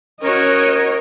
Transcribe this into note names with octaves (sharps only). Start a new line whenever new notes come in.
C#4 F#4 A#4 C#5 D#5